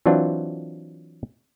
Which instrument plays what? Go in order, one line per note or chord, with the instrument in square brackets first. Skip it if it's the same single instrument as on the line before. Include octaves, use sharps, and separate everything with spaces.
[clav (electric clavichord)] E3 F#3 C4 D4 F4